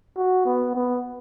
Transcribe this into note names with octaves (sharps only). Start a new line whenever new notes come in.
F#4
B3
B3